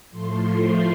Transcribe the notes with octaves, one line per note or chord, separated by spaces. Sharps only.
A2 F3 A3 C6
C6